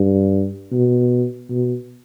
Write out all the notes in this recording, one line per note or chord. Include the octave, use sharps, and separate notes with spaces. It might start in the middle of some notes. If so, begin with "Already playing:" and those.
Already playing: G2
B2
B2